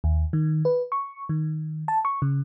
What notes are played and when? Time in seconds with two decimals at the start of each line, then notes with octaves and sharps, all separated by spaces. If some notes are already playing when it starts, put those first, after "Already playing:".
0.04 D#2
0.33 D#3
0.65 B4
0.92 C#6
1.29 D#3
1.88 A5
2.05 C#6
2.22 C#3